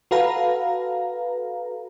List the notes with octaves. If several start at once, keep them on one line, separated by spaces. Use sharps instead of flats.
F#4 A4 B4 F5 A#5